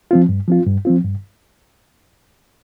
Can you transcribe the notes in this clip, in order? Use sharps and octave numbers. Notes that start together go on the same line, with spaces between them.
F3 C4 F4
G2
F3 C4 F4
G2
F3 C4 F4
G2